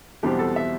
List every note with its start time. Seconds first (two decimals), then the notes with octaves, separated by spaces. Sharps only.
0.23 E2 B2 G3 C4 G4
0.39 A4
0.56 E5